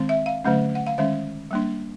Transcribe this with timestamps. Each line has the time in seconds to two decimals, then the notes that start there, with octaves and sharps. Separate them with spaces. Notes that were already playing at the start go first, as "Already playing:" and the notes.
Already playing: D#3 G#3 C4
0.09 E5
0.26 F5
0.44 D3 F#3 A3 C#4
0.75 F#5
0.87 F5
0.98 D#3 G#3 C#4 E5
1.51 G3 A#3 D4